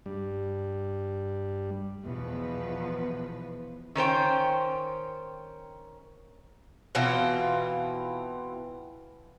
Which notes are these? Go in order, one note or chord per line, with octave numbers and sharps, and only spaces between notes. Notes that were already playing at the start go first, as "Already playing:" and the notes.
G2 G3
B1 E2 B2 F3 B4
D#3 C#4 C5 G5
B2 E3 C4 F4